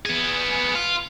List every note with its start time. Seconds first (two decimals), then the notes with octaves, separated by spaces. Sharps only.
0.06 B3 G#4
0.75 F4